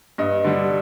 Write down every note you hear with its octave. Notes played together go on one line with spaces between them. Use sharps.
G2 D#5
D3 G3